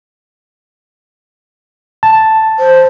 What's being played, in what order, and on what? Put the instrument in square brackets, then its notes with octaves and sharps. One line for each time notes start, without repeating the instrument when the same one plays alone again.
[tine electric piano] A5
[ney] C5